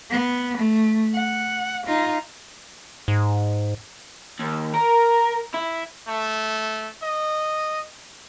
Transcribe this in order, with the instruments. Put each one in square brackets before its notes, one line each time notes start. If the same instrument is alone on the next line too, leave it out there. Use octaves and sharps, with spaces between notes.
[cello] B3
A3
F#5
D#4 F4
[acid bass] G#2
[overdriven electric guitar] D#2
A#4
E4
[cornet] A3
D#5